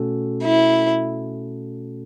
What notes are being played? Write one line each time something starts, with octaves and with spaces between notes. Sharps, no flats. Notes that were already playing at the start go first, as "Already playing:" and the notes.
Already playing: B2 A3 C#4 F#4 A4
E4